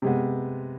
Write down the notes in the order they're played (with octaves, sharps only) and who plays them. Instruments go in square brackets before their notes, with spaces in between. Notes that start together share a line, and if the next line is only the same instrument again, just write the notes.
[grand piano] C3 G#3 B3